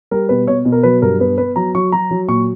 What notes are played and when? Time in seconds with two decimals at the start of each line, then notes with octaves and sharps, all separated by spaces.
0.11 G3 A#4
0.29 B2 B4
0.47 B2 C#5
0.65 B2
0.72 A#4
0.83 F#3 B4
1.02 G2 A#4
1.19 B3 B4
1.38 B3 B4
1.56 F#3 A#5
1.75 F#3 C#6
1.92 F#3 A#5
2.11 F#3
2.28 A#2 C#6